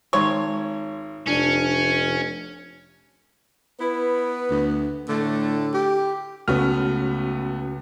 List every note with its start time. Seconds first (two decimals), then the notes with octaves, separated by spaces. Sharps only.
0.13 G#1 C#5 C6
1.27 F1 C#4 D4
3.80 B3 E4 B4
4.50 D2
5.09 A2 D3 A3
5.74 G4
6.48 C#2 A3 B3 C#4 F#4 F6